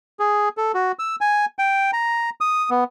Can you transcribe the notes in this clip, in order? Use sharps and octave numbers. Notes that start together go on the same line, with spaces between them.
G#4
A4
F#4
E6
G#5
G5
A#5
D#6
B3